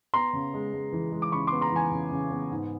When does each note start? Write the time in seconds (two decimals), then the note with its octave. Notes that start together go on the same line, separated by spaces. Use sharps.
0.14 B3 A#5 C6
0.33 C#3
0.54 G#3
0.73 G#3
0.93 E3
1.12 G#3
1.22 D6
1.32 C#3 B5 C#6
1.47 C6 D6
1.52 B3
1.61 A#5 C6
1.72 E3 G#5 A#5
1.92 C#3
2.11 C#3
2.31 B3
2.51 G#2